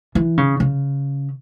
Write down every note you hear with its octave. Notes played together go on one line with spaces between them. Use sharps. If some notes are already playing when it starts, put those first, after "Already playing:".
E3
C#3
C#3